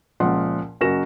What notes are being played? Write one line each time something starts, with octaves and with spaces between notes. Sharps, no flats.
C#2 A#2 F3 F#5 C6
F#1 F#2 F#4 A#4 A#6 E7